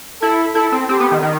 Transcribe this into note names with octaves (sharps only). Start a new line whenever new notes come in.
E4 A4
E4 A4
C4
C4 G4
B3
D#3
D#3